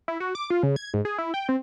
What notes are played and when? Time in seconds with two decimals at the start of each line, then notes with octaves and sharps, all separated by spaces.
0.08 E4
0.20 F#4
0.35 D6
0.50 F4
0.63 C#3
0.76 G#6
0.94 G#2
1.05 G#4
1.18 E4
1.34 G5
1.49 C4